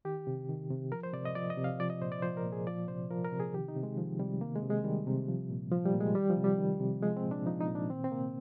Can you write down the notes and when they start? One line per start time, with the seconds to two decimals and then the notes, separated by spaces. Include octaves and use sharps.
0.05 D#3 G4
0.27 C3
0.49 D#3
0.70 C3
0.92 F3 A#4
1.03 C5
1.13 C3 D5
1.25 D#5
1.35 F3 D5
1.50 D#5
1.57 C3
1.64 F5
1.80 F3 D5
1.90 D#5
2.02 A#2 C5
2.12 D5
2.22 F3 C5
2.37 A#4
2.45 A#2
2.52 G#4
2.67 F3 D5
2.88 C3 C5
3.10 F3 A#4
3.25 A#4
3.32 C3
3.40 G#4
3.53 D#3 G4
3.68 D#4
3.76 C3
3.83 G#3
3.97 D#3 F3
4.19 C3 G3
4.41 D#3 A#3
4.56 G#3
4.63 C3
4.70 G#3
4.84 D#3 G3
5.07 C3
5.28 F3
5.50 A#2
5.72 F3
5.86 G3
5.94 A#2
6.01 G#3
6.15 D#3 G3
6.30 F3
6.37 C3
6.44 G3
6.58 D#3
6.80 C3
7.03 F3 G#3
7.17 C4
7.24 A#2
7.31 D4
7.46 F3 D#4
7.61 D#4
7.68 A#2
7.75 D4
7.90 D#3 C4
8.04 C4
8.11 C3 A#3